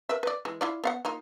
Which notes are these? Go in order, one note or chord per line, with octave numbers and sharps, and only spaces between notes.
A#4 B4 E5
B4 D5
E3 G#3
E4 F4 D5
B3 F5 F#5
A#3 D#4 F4